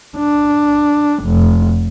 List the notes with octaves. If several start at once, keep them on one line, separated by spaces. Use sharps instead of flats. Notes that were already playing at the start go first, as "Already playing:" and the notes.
D4
F1